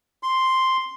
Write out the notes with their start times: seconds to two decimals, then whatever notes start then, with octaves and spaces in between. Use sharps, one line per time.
0.23 C6